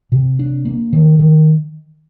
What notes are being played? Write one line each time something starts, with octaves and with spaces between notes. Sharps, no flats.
C3
D4
A#3
D#3
D#3